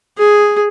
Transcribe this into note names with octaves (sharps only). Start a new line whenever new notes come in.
G#4